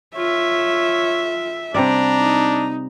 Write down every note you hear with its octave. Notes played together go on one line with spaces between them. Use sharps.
F4 C#5 E5
C3 G3 D4 D5 A#5
D#4